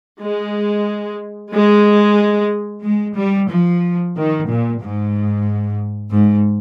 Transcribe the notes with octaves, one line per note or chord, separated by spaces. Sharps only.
G#3
G#3
G#3
G3
F3
D#3
A#2
G#2
G#2